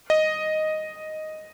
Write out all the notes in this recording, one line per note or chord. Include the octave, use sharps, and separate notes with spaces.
D#5